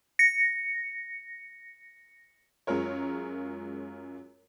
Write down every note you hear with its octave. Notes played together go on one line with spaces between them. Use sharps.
A#6 C#7
F#2 G#3 C#4 F4 A#4 C#5